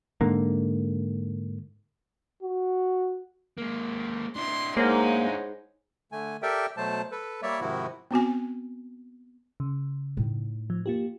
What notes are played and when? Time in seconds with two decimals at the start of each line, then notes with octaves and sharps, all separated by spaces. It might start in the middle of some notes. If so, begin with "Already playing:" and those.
0.21 G#2 D3 A#3
2.43 F#4
3.58 G#3 A#3
4.36 D4 E4 C6
4.77 G#3 A#3 D#4 C5 C#5 F#5
6.12 D3 A3 G#5
6.42 G4 A4 A#4 D5 E5 G5
6.77 B2 F#3 A3 C5 A5
7.12 A4 B4
7.42 G3 A#3 C#5 D5 E5
7.60 G#2 C3 D#3 F3 E4 F#4
8.11 B3 C4 F#4 G#5
9.60 C#3
10.17 A2 D#4
10.70 F3
10.86 A#3 F4 G4